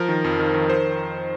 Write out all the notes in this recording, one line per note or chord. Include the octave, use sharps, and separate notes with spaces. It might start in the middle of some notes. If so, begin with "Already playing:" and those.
Already playing: F3 A#4
D#3
F2
D#3
D#3
C5